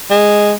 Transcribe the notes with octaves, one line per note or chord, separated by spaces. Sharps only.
G#3